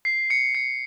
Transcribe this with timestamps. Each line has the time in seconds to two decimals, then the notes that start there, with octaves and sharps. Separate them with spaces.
0.05 C7
0.30 C#7
0.55 C#7